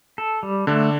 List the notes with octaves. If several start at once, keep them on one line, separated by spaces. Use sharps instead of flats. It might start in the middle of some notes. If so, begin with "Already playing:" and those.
A4
G3
D3 A3 D4